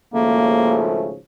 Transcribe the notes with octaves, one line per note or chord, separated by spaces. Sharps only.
G#1 C#3 F3 A3 A#3